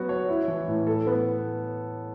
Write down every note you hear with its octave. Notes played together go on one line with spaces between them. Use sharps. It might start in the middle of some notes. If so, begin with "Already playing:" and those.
Already playing: F#3 B3 F#4
C#5
E4
E3
A2
A4
B3